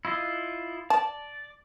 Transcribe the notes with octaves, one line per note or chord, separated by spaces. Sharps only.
E4 F4 D#5
D5 A5